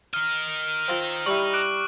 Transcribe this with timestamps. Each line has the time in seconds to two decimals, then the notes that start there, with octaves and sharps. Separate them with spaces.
0.14 A#4 D#5 F6
0.88 C4 F4
1.26 G3 E4 C#6 F#7
1.53 D6 F#6 D7